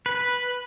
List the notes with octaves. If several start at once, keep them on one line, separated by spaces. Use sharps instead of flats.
B4